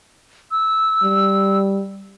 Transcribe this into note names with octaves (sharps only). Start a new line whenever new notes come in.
E6
G3